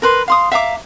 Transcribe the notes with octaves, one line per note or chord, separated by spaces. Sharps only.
A#4 B4 C6
F5 C6 D#6
E5 F5 A#5 D6